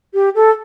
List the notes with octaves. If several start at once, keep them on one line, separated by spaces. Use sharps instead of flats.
G4
A4